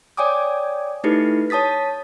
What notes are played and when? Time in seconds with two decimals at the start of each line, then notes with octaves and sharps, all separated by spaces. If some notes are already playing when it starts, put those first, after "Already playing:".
0.17 C#5 D5 G5 G#5 D6 D#6
1.04 A3 D#4 E4 G4 A4 B4
1.50 C#5 A5 D#6 A6 B6